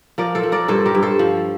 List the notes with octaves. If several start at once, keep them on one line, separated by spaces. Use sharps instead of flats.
F3 A#4 D5
A4 C5
F3
A#4 D5
G2 A4 C5
G4 A#4
G2
A4 C5
F3